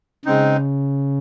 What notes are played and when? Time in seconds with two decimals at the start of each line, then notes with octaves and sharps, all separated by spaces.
0.25 C#3 G#3 C4 D#4